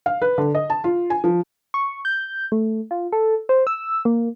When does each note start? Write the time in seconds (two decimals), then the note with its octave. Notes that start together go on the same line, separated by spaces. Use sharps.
0.06 F5
0.22 B4
0.38 D3
0.55 D#5
0.70 A5
0.84 F4
1.10 G#5
1.24 F3
1.74 C#6
2.05 G6
2.52 A3
2.91 F4
3.12 A4
3.49 C5
3.67 E6
4.05 A#3